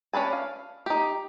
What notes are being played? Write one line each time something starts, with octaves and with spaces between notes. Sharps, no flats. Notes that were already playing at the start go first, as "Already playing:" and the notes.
C#4 D4 B4 G#5
F5
D#4 G4